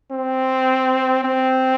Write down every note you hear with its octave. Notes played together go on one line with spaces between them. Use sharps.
C4
C4